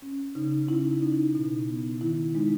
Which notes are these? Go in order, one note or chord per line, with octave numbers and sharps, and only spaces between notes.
C#4
C#3 D#4
C#4 E4
C#4 D#4
B2
B3
D#3 E4
G#3 D#4